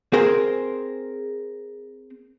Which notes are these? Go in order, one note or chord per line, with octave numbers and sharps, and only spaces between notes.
C4 G#4 A#4 C5